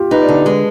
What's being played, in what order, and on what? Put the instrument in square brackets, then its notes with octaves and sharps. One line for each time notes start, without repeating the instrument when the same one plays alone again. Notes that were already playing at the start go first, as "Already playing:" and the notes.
Already playing: [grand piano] F4 G4
[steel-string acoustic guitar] D#4 [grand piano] B4
[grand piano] D5
[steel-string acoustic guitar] D3
[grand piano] D5
[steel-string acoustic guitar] G#3 [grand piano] B4